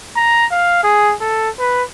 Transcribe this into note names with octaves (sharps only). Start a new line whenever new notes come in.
A#5
F5
G#4
A4
B4